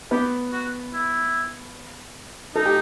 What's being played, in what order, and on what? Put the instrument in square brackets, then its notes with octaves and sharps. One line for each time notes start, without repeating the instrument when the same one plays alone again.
[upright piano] B3 B4 [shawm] G4
[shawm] F#4
E4
[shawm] D#4 [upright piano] A4
[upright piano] G4